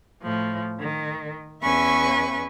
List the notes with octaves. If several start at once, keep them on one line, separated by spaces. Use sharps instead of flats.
A2 F3
D#3
E2 C#4 B4 E5 G#5 C#6